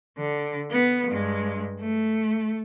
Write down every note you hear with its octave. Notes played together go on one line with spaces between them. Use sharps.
D3
B3
G2 G#3
A3